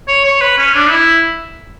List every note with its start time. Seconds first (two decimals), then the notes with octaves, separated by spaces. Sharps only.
0.08 C#5
0.24 C#5
0.41 B4
0.58 C#4
0.74 D4
0.90 E4